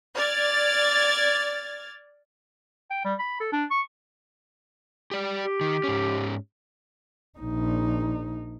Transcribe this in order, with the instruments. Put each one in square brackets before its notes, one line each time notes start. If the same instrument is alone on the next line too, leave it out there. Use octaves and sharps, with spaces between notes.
[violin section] D5 F6 G#6 A6
[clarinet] G5
G3
B5
A4
D4
C#6
[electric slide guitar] G4 D5
[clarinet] G4
[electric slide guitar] D#3
G#2 C#4
[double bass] A#1 D#4